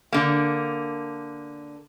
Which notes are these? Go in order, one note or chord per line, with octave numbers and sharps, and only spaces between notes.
D3 A#3